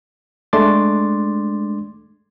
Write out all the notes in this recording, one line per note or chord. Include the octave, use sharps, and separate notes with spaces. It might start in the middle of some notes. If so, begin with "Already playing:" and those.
G#3 A3 D4 C6 D6 A6